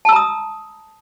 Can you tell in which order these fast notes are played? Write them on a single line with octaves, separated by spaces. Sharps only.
A5 E6 A#5 D#6